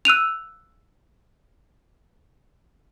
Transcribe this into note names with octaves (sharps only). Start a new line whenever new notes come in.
E6 F#6 D#7 F7